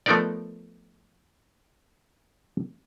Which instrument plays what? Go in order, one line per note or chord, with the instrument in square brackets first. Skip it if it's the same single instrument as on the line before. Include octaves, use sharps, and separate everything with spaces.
[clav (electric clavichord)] F3 A3 B3 D#4 A#4 D5